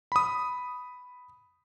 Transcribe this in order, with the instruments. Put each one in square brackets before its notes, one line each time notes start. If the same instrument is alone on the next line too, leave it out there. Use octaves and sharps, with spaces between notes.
[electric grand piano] B5 D#6